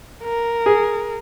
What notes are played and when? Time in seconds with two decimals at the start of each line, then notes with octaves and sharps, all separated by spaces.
0.23 A#4
0.66 G#4